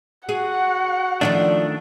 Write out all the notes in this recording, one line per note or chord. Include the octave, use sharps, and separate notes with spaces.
F#4 G#4 F#5
D#3 F3 A3 C#4 D4 D5